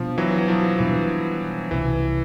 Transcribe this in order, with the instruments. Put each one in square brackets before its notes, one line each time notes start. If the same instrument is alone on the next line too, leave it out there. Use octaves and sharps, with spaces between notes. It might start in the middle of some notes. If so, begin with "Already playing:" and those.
Already playing: [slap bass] B2 G3 B3 D4 [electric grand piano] F3
[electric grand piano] E3 F#3
F#3
F3
[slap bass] B2 G3 B3 D4 [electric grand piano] E3
[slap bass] C2 B2 G#3 C#4 [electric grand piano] E3